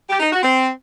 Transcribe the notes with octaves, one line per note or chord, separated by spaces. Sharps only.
G4
D#4
F#4
C4